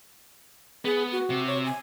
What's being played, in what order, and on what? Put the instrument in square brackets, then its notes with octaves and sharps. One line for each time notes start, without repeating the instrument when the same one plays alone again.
[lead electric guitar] B3 [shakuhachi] G#4
[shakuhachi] F#4
[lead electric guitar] C3
[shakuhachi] C#5
G#5